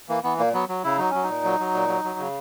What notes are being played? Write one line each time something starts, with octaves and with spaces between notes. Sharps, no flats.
E3 A#3
E3 B3
A#2 A#3
F#3 B3
F#3
C#3 E4
F#3 D#4
F#3 C#4
D#4
A#2
F#3
F#3
A#2
F#3
F#3
C#3